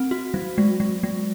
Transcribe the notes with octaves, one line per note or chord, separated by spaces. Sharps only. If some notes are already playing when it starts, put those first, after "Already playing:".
Already playing: C4
F#4
F#3
G#3
G#3
G#3